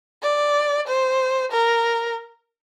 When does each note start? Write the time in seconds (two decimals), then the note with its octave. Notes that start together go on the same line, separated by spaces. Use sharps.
0.23 D5
0.88 C5
1.52 A#4